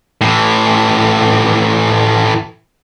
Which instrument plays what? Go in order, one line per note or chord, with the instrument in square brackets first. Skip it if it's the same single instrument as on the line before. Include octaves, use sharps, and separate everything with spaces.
[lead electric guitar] A2 E3